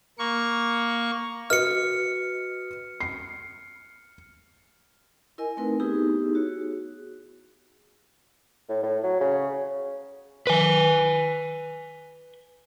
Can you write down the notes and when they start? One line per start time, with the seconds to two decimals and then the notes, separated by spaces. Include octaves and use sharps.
0.19 A#3 C#6
1.50 F#4 B4 D#5 F6 C#7
3.00 C7
5.38 E4 A#4 D#5 G#5
5.57 A3 C4 D#4 A#4 B4
5.80 B3 D#4 E4 G4 G#4
6.35 F#4 G#4 C#5
8.69 A2
8.83 A2
9.03 F#3
9.20 C#3
10.47 B4 G#5